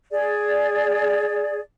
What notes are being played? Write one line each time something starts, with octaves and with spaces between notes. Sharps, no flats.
G#4 D5